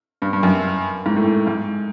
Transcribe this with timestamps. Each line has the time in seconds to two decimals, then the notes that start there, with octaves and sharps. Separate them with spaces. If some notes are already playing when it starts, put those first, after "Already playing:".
0.22 G2
0.33 G2
0.43 F#2
1.06 G#2
1.16 A2
1.47 G#2